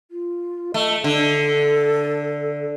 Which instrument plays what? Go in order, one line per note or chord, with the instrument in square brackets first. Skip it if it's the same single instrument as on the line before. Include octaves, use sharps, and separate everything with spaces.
[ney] F4
[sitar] A3 [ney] D#5
[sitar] D3 [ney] A4